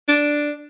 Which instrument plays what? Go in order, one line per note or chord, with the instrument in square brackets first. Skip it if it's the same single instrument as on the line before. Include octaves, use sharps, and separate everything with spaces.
[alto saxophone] D4